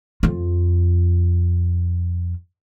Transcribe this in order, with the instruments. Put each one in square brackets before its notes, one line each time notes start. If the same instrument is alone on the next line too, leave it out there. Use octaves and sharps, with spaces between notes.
[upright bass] F2 F4